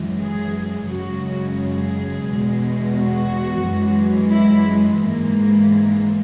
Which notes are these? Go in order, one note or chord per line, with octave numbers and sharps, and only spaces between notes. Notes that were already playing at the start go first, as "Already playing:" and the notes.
Already playing: F#2 E3 G#3
G#4
F#2 C#3 G#3 F#4
G#4
E2 B2 G#3
F#4
F#2 E3 G#3
E4
G#3
G#2 E3 G#3 A#3